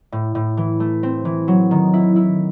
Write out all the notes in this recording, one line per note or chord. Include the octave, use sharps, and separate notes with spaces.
A2
A2
E3
A3
C4
E3
F#3
D#3
E4
E4